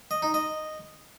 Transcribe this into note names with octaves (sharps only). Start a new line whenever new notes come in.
D#5
D#4
D#5